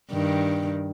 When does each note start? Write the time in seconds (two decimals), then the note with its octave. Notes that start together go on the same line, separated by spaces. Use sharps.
0.11 G2 D#3